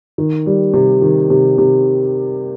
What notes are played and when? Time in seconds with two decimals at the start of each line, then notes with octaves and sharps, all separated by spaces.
0.18 D#3
0.46 G3
0.74 C3
1.02 D#3
1.30 C3
1.58 C3